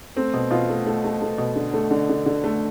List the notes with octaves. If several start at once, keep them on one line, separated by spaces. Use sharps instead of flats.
A3 C4
B2
B2 F4
A3
A3
A3
A3
B2
D3
A3
D3
D3
D3
A3